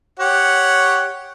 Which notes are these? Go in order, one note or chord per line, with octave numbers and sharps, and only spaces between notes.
G4 C#5 F#5